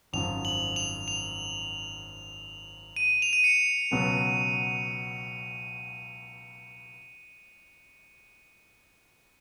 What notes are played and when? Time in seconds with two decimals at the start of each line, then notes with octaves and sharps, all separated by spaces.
0.13 G#1 F#2 F3 F7
0.45 F#7
0.76 F7
1.08 F7
2.96 D#7
3.22 F7
3.33 D#7
3.44 C#7
3.91 C#2 B2 F#3 B3